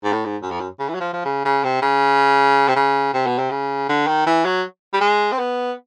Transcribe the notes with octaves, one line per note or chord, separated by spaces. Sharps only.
G#2
A2
G#2
F#2
F2
F#2
C#3
E3
F#3
F3
F3
C#3
C#3
C3
C#3
C3
C#3
C3
B2
C3
C#3
D3
D#3
E3
F#3
G3
G#3
C4
B3